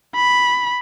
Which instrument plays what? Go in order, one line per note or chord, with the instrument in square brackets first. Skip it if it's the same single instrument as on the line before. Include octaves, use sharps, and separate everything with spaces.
[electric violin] B5